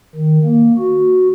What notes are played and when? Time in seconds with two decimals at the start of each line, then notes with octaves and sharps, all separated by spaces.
0.15 D#3
0.44 A#3
0.78 F#4